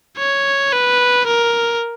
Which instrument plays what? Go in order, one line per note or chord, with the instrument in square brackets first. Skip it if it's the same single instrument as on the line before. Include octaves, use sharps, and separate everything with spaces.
[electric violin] C#5
B4
A#4